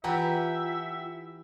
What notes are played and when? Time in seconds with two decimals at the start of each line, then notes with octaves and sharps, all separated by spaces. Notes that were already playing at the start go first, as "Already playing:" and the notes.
0.04 E3 E4 F4 G4 E5 F#5 G5 A#5